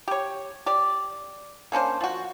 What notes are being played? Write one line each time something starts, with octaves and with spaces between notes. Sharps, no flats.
G4 C#5
G4 D5
A#3 C#4 D4 C5
F3 F#4